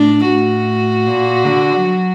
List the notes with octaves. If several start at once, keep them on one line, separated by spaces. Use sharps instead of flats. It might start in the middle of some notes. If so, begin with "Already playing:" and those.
Already playing: A2 D4
A2 F#4
A#2
D3
F#3